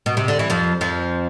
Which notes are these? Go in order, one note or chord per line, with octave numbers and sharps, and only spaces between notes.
B2
C3
D3
E3
F2 F3
F2 F3